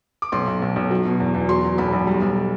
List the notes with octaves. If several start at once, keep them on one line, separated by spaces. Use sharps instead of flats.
D6
B1 C6
B1
B1
B1
F#3
B2
E2
E2
F#3 C6
F#3
B1 B5
B1
G3
B1